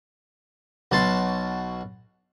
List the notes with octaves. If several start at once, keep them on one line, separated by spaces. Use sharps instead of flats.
B1 F#4 A5 C6